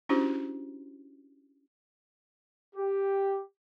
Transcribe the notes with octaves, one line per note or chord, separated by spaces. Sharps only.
C#4 D4 E4 F#4 G4 C5
G4